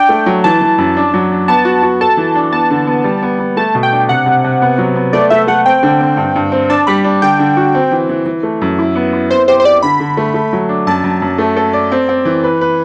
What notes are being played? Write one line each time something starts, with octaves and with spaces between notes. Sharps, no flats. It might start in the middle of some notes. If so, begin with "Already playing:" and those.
Already playing: D4 G5
A3
F#3
E3 A5
E3
F#2
D4
F#3
D4
B3 A5
F#4
F#4
A4 A5
E3
D4
B3 A5
D3
B3
G3
B3
B3
A3 A5
B2
G5
D4
C3 F#5
C3
C3
B3
F#3
B3
A3 D5
A3 E5
A3 F#5
C4 G5
D3
C4
G2
G2
C4
D4 A5
G3 B5
D4
D3 G5
D3
F#4
C4
E3
E3
E3
A3
F#2
E4
B3
E4
C4 C5
G4 C5
C5
G4 D5
D3 B5
D3
A3
A3
F#3
D4
F#2 A5
F#2
F#2
A3
A4
D5
C4
C4
E3
B4
B4